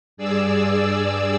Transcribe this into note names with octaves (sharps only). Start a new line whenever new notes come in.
G2 G#4 D5 E6